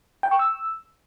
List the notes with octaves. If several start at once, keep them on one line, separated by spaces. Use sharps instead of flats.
G5
C#6
E6